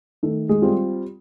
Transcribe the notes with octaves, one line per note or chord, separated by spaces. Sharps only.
D#3 A3 A4
G#3 G#4
G3 C4 F4